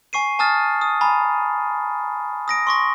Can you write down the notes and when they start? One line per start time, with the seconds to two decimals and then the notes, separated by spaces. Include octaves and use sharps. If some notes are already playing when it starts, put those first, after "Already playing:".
0.13 G#5 C#6 C7 D#7
0.39 G#5 A5 D#6 F6 A6
0.81 D#6
1.01 G#5 A#5 B5
2.48 D#6 A#6 D7
2.67 C6 C#6 A#6